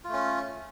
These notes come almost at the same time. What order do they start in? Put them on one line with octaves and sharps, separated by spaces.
F4 A3 C#4